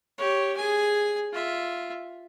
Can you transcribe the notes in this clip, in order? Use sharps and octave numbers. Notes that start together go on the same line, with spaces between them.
G4 C#5
G#4 G#5
F4 E5